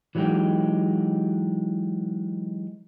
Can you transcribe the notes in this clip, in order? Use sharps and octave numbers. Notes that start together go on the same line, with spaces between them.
E3 F#3 G#3 D#4 G4